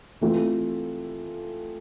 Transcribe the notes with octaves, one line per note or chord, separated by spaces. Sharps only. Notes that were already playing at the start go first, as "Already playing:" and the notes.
E3 A3 C4 F4 A4